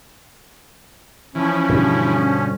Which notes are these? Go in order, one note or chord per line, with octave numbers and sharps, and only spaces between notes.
E3 F3 C#4
G2 B2 D3